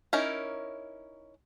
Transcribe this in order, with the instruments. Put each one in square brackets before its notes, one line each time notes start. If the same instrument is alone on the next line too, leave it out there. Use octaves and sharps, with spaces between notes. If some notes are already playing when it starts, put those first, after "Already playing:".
[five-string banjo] C#4 D#4 E4 A#4